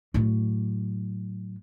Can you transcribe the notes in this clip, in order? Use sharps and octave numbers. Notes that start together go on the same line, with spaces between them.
A2 F#3